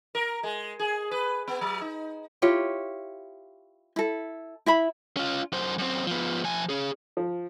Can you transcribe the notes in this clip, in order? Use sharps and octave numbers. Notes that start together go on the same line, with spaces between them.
A#4
G#3
G#4
B4
B3
F#3
D#4
E4 F4 G4 C#5
E4 A4
E4 E5 B5
C#4 F4
F#2 C5
F#2 C4
F3 B3
F3 G#5
C#4 G#4
F3